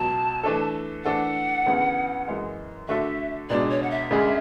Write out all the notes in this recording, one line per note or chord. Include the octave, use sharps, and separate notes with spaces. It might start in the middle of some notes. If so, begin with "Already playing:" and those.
Already playing: C#2 B2 F#3 A5
E3 A3 D4 A4
E3 A3 D4 A4 F#5
D2 C#3 E3 B3
F#2 E3 G#3
D3 A3 D4 F#4 A4 E5
C#2 B2 G#3 D4 D5
C#5
F#5
E5
D2 C#3 G#3 D4 G#4